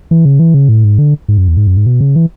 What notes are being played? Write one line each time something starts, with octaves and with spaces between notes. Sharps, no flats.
E3
C#3
E3
C#3
A2
G#2
D3
G#2
F#2
E2
G#2
F#2
G#2
B2
C#3
E3